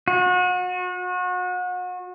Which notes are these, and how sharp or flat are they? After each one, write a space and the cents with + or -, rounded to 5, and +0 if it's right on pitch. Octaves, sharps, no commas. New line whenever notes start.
F#4 -35